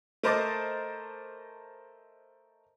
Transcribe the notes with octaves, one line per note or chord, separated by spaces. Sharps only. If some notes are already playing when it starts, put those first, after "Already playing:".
A3 A#4 C5 D#5 A5 D6